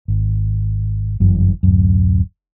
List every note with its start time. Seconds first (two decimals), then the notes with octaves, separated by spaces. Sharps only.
0.08 G#1
1.20 G1 F#2 E3
1.63 D1 F#2